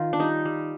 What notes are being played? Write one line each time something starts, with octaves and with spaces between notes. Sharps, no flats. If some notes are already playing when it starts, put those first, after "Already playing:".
Already playing: D#3 F4
D4
G3 D#4
G3